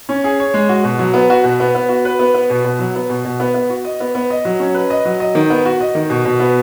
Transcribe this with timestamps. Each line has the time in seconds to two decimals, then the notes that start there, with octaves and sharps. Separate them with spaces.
0.09 C#4
0.24 G#4
0.40 C#5
0.54 G#3
0.69 F#4
0.84 B2
0.99 F#3
1.14 B3
1.30 F#4
1.44 B2
1.60 B3
1.75 B3
1.89 F#4
2.05 B4
2.19 B3
2.34 B3
2.50 B2
2.64 B2
2.79 F#3
2.95 B3
3.09 B2
3.25 B2
3.40 B3
3.54 B3
3.70 F#4
3.85 D#5
4.00 B3
4.15 B3
4.30 D#5
4.45 F#3
4.60 C#4
4.74 B4
4.90 D#5
5.05 F#3
5.20 D#5
5.35 D#3
5.50 B3
5.65 F#4
5.81 D#5
5.95 D#3
6.10 B2
6.25 B2
6.40 B3